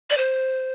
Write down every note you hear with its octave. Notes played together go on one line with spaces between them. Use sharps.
D5
C5